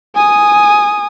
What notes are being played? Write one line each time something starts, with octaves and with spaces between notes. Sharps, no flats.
G#5 D#6